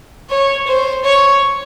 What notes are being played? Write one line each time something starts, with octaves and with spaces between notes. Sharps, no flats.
C#5
C5
C#5